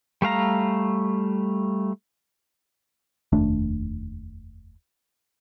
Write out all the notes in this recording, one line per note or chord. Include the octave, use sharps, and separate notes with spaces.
G3 A3 F5 A#5
F1 D#2 A3 D4